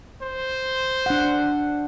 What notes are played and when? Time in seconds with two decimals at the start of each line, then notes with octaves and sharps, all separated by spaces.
0.22 C5
1.06 D4 F#5